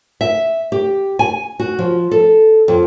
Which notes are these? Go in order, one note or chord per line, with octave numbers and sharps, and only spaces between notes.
E5
G4
G#5
F#4
F3
A4
F2